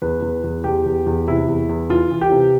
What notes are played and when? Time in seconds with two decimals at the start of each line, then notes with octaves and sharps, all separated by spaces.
0.02 E2 B4
0.22 E2
0.44 E2
0.64 E2 G4
0.86 E2
1.06 E2
1.28 C3 E4
1.48 E2
1.69 E2
1.90 E3 F4
2.11 E3
2.21 G4
2.32 C3